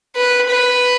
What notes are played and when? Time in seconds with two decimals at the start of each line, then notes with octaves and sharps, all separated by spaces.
0.16 B4
0.50 B4